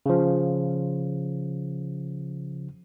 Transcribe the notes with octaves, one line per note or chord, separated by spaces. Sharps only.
C#3 F3